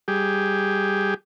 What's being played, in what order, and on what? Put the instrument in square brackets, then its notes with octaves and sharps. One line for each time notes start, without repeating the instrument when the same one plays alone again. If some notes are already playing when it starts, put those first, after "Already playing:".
[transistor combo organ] G3 G4 G#4